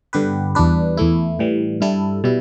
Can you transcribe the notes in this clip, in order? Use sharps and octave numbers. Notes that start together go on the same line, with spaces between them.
G2 D3 B3 G4 B4
E2 E3 G3 D4 B4
E2 E3 A3 E4
A2 E3 G3
G2 G3 E4 A4
B2 G3 E4